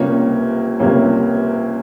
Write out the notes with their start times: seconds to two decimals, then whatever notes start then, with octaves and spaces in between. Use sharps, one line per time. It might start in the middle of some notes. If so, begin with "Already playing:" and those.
Already playing: C#2 C3 G3 A#3 C#4
0.79 C#2 C3 G3 A#3 C#4